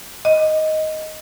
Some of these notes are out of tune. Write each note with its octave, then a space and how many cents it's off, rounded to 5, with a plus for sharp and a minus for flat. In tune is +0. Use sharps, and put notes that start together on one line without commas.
D#5 +5